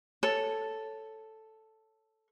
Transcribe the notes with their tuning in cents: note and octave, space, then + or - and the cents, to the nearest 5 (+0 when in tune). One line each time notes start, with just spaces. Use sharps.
A4 +0 C#5 +0